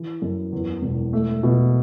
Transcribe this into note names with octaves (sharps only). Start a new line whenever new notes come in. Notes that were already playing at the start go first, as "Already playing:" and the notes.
Already playing: E3
F#2
E2
E1
A3
B2